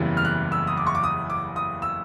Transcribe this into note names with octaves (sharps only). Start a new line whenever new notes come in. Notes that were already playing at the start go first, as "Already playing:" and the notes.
Already playing: F#1 E2 C#3 E3 G3
F6
F#6
E6
D#6
D6
C#6
D6
D#6
D6
D#6
E6